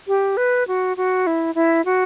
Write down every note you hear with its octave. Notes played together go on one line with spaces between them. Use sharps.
G4
B4
F#4
F#4
E4
E4
F#4